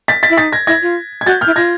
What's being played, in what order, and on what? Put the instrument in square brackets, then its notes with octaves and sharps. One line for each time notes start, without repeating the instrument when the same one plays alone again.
[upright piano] A6 B6
A6 B6
[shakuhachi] E4
[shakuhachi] D#4 [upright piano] A6 B6
[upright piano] G#6 A#6
[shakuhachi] E4 [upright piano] G#6 A#6
[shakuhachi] F4
[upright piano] G#6
[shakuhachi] F#4 [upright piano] G6 A6
[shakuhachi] E4 [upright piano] F6 G6
[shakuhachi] F4 [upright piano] G#6 A#6